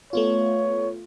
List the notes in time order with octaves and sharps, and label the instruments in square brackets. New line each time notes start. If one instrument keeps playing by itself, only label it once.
[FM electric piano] A3 B3 F4 [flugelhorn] C#5